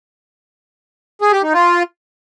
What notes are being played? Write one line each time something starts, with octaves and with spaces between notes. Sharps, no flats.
G#4
G4
D#4
F4